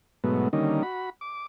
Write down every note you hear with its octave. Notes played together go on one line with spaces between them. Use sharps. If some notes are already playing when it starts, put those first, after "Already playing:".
G#2 B2 F#3 A3 B3
D3 D#3 G3 A#3 C#4 D#4
F#4 B5
D6